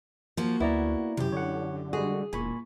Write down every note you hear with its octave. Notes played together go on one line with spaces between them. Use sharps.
F3 A#3 F#4
D2 B3 E4 D5 A#5
F#2 C3 G4
D3 C#5 F#5
G3 G#3 F#4 G#4
E1 A#2 G#5 B5 C#6